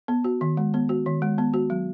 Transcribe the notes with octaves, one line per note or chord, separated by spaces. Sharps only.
B3
F#4
D#3
G#3
B3
F#4
D#3
G#3
B3
F#4
F#3